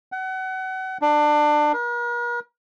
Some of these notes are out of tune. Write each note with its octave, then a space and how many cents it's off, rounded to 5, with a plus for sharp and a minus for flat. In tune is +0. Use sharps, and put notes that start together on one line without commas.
F#5 +30
D4 +25
A#4 +45